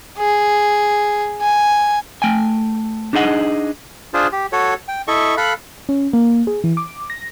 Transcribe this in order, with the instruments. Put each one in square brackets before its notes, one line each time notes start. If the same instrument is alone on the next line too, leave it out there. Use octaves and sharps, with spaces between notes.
[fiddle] G#4
G#5
[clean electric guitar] A3 G5 G#5
D4 D#4 G#4 D#5 F#5
[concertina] D4 F4 G#4 C5
G4
F#4 A4 C#5
G5
E4 A4 D#5 E5 C#6
A4 F5 B5 F#6
[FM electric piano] C#4
A#3
G#4
E3
D6
A#6